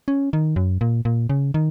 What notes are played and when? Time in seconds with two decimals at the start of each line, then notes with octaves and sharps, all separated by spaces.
0.08 C#4
0.33 D#3
0.56 F#2
0.81 A#2
1.05 A#2
1.29 C#3
1.54 D#3